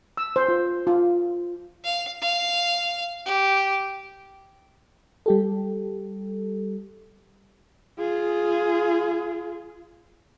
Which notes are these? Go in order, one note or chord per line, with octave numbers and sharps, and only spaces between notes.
E6
C5
F4
F4
F5
F5
G4
G3 G4 A4
F4 G#4